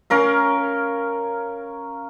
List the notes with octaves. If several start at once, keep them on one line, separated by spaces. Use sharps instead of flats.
C#4 A#4 F5